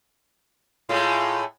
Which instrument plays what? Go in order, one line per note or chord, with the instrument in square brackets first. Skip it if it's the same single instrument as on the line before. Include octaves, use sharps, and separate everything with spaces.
[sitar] A2 G#3 A3 [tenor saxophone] F4